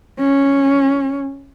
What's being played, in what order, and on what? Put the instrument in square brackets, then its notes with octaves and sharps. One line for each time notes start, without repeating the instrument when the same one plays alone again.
[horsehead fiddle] C#4